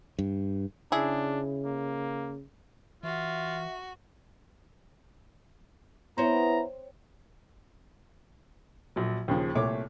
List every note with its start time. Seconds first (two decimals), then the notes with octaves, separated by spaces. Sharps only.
0.19 G2
0.92 C#3 D4 E4 G#4
1.65 A#3
3.03 E3 F4 F#4 E5
6.18 B3 C4 E4 C#5 A#5
8.96 A#1 F#3
9.28 D#2 C#3 F3
9.55 C2 A#2 A3 C#5 D6